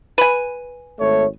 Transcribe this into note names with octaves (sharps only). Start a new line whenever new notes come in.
B4 G#5
G#1 A3 C#5